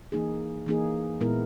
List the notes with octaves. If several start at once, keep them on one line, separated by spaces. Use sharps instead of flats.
E3 A#3 D#4 G#4
E3 A#3 D#4 G#4
A#2 G#3 B3 E4 A#4